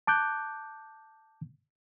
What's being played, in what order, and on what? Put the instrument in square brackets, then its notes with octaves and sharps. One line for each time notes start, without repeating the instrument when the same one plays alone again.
[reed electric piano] A5 D6 F#6 G6